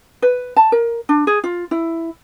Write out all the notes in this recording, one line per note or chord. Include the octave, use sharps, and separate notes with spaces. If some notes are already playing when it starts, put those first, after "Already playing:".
B4
A5
A#4
D4
G#4
F4
E4